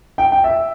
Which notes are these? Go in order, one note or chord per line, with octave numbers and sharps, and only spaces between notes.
G5
G5
E5